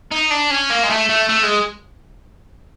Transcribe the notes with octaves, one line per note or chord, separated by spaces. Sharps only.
D#4
D4
C#4
A#3
G#3
A3
A3
A3
G#3